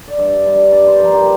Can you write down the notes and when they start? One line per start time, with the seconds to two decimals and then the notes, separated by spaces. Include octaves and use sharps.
0.08 D5
0.18 G2 E5
0.47 G2
0.72 G2 D5
0.87 C5
1.00 F3 A#4
1.14 G4